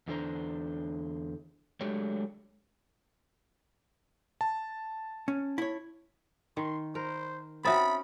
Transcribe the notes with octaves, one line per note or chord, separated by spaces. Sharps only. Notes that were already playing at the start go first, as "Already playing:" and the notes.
E2 D3 D4 C5 A#5
F#3 G#3 A3 D4 G4 C#5
A5
C#4
E4 C#5
D#3 C6
A#4 C5
C4 C#4 F#4 E5 B5 D#6 A6